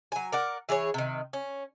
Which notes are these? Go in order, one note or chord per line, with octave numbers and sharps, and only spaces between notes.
F#3 G#5
A#4 D5 F#5
E3 G#4 A4 C#5
C3 D#3
C#4